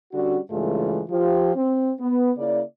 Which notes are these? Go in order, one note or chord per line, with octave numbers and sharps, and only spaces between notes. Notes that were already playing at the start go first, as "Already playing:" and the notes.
D3 G3 C#4 D4 F#4
G2 C#3 E3 G#3 A3 F4
F3 F4 G4
C4
B3
C#3 A#3 E4 D5